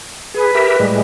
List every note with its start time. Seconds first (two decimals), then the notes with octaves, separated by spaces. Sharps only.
0.34 G#4 B4
0.55 G4 A#4 E5
0.79 A2 G3 G#3